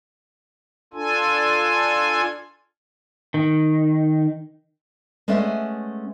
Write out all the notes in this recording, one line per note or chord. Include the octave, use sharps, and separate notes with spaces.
D4 F4 A4 G#5
D#3
G#3 A3 B3 C#4 D5 E5